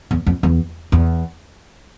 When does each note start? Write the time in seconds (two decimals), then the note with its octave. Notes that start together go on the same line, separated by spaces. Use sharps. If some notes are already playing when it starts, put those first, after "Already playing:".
0.11 E2
0.26 F2
0.43 E2
0.92 E2